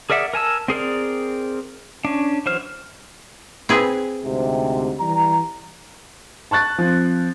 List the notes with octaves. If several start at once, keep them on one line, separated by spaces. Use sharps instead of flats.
G#4 A#4 D5 E5 F#5
A#4 G#5 A5 E6
C4 G#4 A#4 D5
C#4 D4
E3 F#3 C5 F6
C4 G#4 B4
D2 G#2 C3
E3 G3 A#5
A5 C#6 F#6 A6
F3 C4